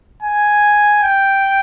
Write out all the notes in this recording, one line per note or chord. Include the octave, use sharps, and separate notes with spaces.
G#5
G5